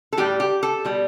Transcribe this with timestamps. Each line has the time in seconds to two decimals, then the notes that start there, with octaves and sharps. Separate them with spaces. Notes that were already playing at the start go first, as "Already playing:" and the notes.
0.13 A4
0.17 A2 G3 G4
0.40 G4
0.63 A4
0.85 B2 G3